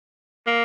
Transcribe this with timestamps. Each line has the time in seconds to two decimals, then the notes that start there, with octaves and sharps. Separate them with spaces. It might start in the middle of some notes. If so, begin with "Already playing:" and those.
0.47 A#3